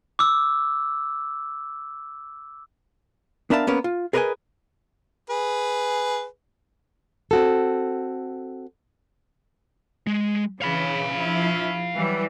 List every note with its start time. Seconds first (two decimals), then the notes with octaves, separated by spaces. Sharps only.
0.19 D6 E6
3.50 B3 D4 A#4 E5 F5 A5
3.67 A#3 B3 C#4 A#4
3.84 F4
4.13 G#4 A#4 B4 C#5 D#5 G#5
5.30 G#4 B4
7.31 C4 F#4 A4
10.07 G#3
10.62 C#3 E3 F5 B5
11.15 F3 E4
11.95 E3 F#3 G3